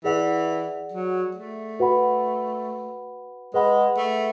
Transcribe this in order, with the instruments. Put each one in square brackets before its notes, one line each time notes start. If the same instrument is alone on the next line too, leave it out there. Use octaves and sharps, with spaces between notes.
[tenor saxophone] E3 [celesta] G#4 D5 F#5
[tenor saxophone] F#3
A3
[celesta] F#4 B4 F#5 B5
[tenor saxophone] G#3 [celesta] G#4 B4 F#5 B5
[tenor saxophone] A3